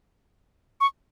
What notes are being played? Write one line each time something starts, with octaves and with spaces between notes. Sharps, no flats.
C#6